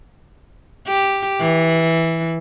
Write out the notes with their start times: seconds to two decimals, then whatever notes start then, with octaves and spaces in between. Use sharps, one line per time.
0.87 G4
1.41 E3